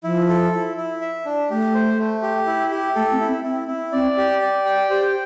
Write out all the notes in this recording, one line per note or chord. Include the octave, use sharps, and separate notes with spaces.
F3 E4
A4
E4
E4
E5
D4
A3 G4
C5
A3
G4
E4
G4
A3 A4
C4
E4
C4
C4 E4
E4
C4 D5
G4
D5
G5
G4 C5